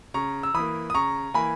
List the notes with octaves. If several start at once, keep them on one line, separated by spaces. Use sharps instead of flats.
C#3 A#5 C#6
E6
E3 A#3 B5 D#6
D#6
C#3 A#5 C#6
E3 A#3 G#5 B5